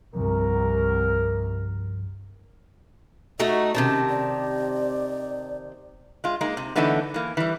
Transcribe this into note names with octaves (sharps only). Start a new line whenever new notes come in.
C2 G2 F3 A#4
A3 D#4 F#4 D#5
C3 D#3 C#4 A5
D5
G#3 F4
G#3 A#3 D#4
C3
D3 E3 A3 B3 D#4 A4
E3 A#3
E3 G3